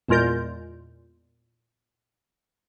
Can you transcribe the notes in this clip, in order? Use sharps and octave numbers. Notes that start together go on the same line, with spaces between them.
E2 A#2 G#3 F4 A#4 G6